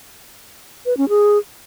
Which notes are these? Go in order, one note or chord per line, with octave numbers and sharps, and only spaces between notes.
B4
C#4
G#4